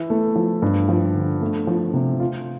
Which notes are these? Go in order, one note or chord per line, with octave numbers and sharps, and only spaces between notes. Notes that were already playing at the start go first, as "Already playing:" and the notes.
Already playing: E3 E4
A3
F3
G2
F3
D3
A3
F3
C3
F4